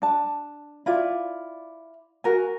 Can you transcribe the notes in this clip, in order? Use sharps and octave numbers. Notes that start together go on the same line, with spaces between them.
D4 A5
E4 F4 D5
F#4 A#4 G#5